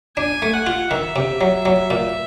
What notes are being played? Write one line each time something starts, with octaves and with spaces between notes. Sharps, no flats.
D4 G#5
A3
F#5
F4
D#3 E5
C3
F#3
F#3
A#2